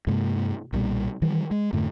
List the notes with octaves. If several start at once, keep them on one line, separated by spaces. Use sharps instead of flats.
G2 C3 G#3 A#3
B1 A#2 F#3 G3
D#3 E3 G3
G#3
F2 G#2 D3 A3